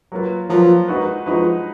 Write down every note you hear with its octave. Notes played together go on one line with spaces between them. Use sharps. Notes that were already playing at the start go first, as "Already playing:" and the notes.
F#3 A#3 F4 B4
F3 F#3 A#3 F4 B4
G#3 D#4 F#4 B4
F3 G#3 D#4 F#4 B4